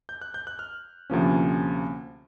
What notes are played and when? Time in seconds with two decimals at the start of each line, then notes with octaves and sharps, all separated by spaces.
0.09 G6
0.21 F#6
0.34 G6
0.47 F#6
0.59 F6
1.10 D2 C3 F3 A#3 C#4